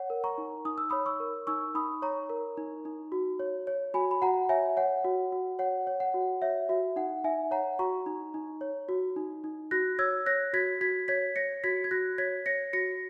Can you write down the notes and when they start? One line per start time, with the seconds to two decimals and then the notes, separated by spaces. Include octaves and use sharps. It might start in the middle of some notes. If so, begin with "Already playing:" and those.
Already playing: C#5 F#5
0.10 A#4
0.24 A#5 C#6
0.38 D#4
0.65 D#4 D#6
0.78 E6
0.90 C#5 B5 D#6
1.06 C#6 E6
1.20 A#4
1.47 D#4 C#6 E6
1.75 D#4 B5 D#6
2.02 C#5 A#5 C#6
2.30 A#4
2.57 D#4
2.85 D#4
3.12 F#4
3.40 C#5
3.67 C#5
3.94 F#4 G#5 B5
4.11 B5
4.22 F#4 F#5 A#5
4.49 C#5 E5 G#5
4.77 C#5 F#5
5.05 F#4
5.32 F#4
5.59 C#5 F#5
5.87 C#5
6.00 F#5
6.14 F#4
6.42 C#5 E5
6.69 F#4 E5
6.96 D#4 F#5
7.24 D#4 E5 G#5
7.51 C#5 F#5 A#5
7.79 F#4 A#5 C#6
8.06 D#4
8.34 D#4
8.61 C#5
8.89 F#4
9.16 D#4
9.44 D#4
9.71 F#4 F#6 A#6
9.99 C#5 E6 G#6
10.26 C#5 F#6 A#6
10.53 F#4 G#6 B6
10.81 F#4 G#6 B6
11.08 C#5 G#6 B6
11.36 C#5 A#6 C#7
11.64 F#4 G#6 B6
11.84 G#6
11.91 F#4 F#6 A#6
12.18 C#5 G#6 B6
12.46 C#5 A#6 C#7
12.73 F#4 A#6 C#7